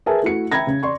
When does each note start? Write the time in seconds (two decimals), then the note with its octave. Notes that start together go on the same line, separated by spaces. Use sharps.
0.06 G#4 A#4 B4 E5 G#5 A5
0.22 A3 E4 F#4 C#7
0.52 E5 G5 A#5 B5 G#6 A#6
0.67 C#3
0.83 D5 C6 C#6